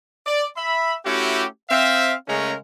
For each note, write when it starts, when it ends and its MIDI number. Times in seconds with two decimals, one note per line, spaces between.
0.27 0.45 74
0.57 0.95 76
0.57 0.95 83
1.05 1.45 57
1.05 1.45 61
1.05 1.45 64
1.05 1.45 66
1.05 1.45 67
1.70 2.14 60
1.70 2.14 76
1.70 2.14 77
2.28 2.55 49
2.28 2.55 56
2.28 2.55 57
2.28 2.55 61
2.28 2.55 70
2.28 2.55 82